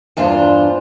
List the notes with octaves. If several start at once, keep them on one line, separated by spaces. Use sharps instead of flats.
E2 G2 D4 F4 C5